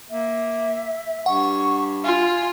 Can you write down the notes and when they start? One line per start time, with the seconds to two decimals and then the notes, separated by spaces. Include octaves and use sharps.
0.10 A#3 E5
1.26 G2 F#5 C#6
2.05 F4 G#5